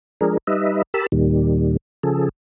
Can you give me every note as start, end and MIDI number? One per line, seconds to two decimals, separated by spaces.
0.21 0.38 53
0.21 0.38 56
0.21 0.38 62
0.21 0.38 68
0.21 0.38 70
0.47 0.82 55
0.47 0.82 63
0.47 0.82 71
0.47 0.82 75
0.47 0.82 76
0.94 1.06 67
0.94 1.06 70
0.94 1.06 81
0.94 1.06 83
0.94 1.06 88
1.12 1.77 39
1.12 1.77 46
1.12 1.77 51
1.12 1.77 55
2.03 2.29 49
2.03 2.29 53
2.03 2.29 68
2.03 2.29 69